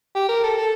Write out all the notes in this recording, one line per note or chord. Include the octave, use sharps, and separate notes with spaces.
G4
A#4
A4
A4